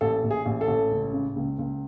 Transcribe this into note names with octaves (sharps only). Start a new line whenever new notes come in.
A1 A4
A1
G#4
A1
A4
A1
C#2
C#3
C#2
C#2